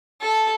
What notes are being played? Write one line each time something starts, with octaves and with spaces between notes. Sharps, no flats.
A4